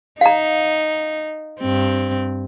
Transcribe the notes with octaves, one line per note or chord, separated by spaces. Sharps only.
D#4 F5 A#5
G2 C4